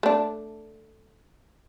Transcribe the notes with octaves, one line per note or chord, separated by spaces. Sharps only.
A3 D4